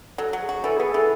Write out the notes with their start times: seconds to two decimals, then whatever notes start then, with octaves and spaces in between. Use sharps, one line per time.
0.18 F#3 A4
0.33 F#3
0.41 G#4
0.49 F#4
0.64 E3 A4
0.78 B3 G#4
0.91 E3 A4